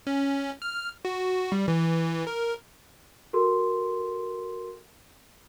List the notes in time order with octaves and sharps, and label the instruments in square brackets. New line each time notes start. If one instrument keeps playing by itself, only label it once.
[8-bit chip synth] C#4
F6
F#4
G3
E3
A#4
[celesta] F#4 A4 A#4 C6